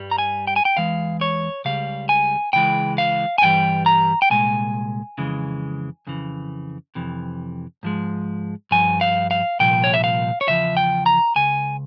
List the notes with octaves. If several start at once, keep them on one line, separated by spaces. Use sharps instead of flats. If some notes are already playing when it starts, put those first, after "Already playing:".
Already playing: G2 G3
A#5
G#5
G5
G#5
G5
E2 E3 G#3 F5
C#5
C#2 C#3 G3 F5
G#5
C#2 C#3 E3 G#3 G5
F5
G#5
G2 E3 G3 G5
A#5
G5
C2 A#2 G#3 G#5
F2 C#3 E3 G#3
F2 C#3 E3
F2 C3 E3
G#2 F3 G#3
G2 F3 G#5
F5
F5
C2 A#2 F3 G5
C#5
E5
F5
C#5
E2 C#3 F3 E5
G5
A#5
C#2 C#3 G#5